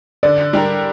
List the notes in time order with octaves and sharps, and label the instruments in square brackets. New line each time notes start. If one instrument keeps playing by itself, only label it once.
[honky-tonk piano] D3 [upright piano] D5
[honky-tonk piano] G3 D4 G4 A#4